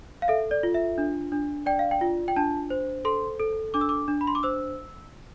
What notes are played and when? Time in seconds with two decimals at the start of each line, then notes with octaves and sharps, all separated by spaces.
0.22 F5
0.28 A4 E5
0.51 D5
0.63 F4
0.74 E5
0.98 D4
1.32 D4
1.66 D5 G5
1.79 F5
1.91 G5
2.01 F4
2.28 G5
2.36 D4 A5
2.70 C5
3.05 A4 C6
3.40 A4
3.74 D4 D6
3.81 E6
3.89 D6
4.08 D4
4.21 B5
4.27 C6
4.35 D6
4.43 C5 E6